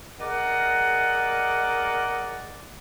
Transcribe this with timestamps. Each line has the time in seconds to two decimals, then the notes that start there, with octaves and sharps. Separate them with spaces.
0.20 G#4 A#4 D5 D#5 F#5